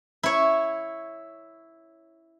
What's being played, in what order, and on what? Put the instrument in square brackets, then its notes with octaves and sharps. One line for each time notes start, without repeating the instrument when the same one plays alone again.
[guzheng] E4 C#5